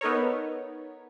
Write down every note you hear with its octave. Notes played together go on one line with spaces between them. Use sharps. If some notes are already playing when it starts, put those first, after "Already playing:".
B3 D#4 A4 A#4 C#5